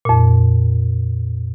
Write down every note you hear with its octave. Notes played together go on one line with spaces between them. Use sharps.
F2 A#2